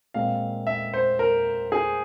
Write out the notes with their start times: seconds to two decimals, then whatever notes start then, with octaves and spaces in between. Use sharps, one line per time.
0.14 A#2 G#3 C4 F5
0.67 E5
0.94 C5
1.19 A#4
1.72 G#4